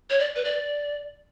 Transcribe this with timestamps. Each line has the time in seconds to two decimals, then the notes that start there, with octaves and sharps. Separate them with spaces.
0.10 C#5
0.19 D5
0.36 B4
0.45 D5